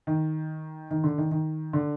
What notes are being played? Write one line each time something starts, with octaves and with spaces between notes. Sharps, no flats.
D#3
D#3
D3
D#3
D#3
D3